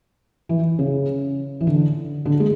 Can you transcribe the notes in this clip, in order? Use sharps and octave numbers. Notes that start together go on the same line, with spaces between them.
E3
C#3
E3
D3
D3
G#3